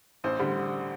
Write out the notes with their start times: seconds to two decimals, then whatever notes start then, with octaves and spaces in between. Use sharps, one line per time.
0.24 A1 C5
0.39 D3 G3